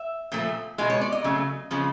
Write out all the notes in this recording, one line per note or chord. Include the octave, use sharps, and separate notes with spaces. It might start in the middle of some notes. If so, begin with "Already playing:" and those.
Already playing: E5
A#2 F3 A3
B2 G#3 D#5
C#5
D5
D#5
C#3 F#3 A3
C#3 F3 G#3